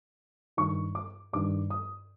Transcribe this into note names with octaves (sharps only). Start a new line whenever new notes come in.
G2 D#3 C#6
D6
G2 D#3 D6
D#6